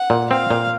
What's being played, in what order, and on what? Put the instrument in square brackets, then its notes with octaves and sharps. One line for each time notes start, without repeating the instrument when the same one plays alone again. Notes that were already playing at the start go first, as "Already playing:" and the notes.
Already playing: [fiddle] F#5
[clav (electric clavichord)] A#2
[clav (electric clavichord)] C4 [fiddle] F5
[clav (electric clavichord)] A#2